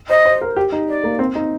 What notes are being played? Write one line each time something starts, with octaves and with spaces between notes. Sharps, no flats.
C5 D#5
C5
A#4
G4
D#4
D5
A#3
C4
D#4